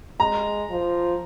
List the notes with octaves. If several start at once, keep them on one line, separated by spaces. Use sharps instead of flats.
G#3 A#5
F3